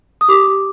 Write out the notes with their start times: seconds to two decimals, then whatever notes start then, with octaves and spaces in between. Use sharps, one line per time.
0.21 D#6
0.28 G4 D6
0.48 G4